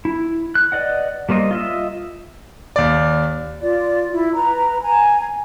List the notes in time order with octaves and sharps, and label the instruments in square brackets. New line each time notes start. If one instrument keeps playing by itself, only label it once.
[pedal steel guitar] E4
F#6
B4 D5 D#5 F#5
G3 A#3 C5 D#5
F4 D#5 E5
[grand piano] D#2 D5
[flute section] F4 D5
E4
B4 A#5
G#5 A#5